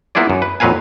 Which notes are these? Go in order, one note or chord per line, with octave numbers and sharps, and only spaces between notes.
A#3 B3 E4 F4 G#4 D5
F#2
B4
F2 A#2 F#3 B4 F5 G#5